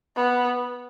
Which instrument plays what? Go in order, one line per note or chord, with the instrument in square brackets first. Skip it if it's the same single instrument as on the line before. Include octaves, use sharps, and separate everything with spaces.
[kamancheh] B3